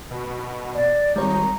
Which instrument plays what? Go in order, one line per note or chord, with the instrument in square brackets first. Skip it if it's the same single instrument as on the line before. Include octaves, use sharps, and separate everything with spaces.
[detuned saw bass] B2
[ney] D5
[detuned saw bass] G#1 [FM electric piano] G3 C#5 [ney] A#5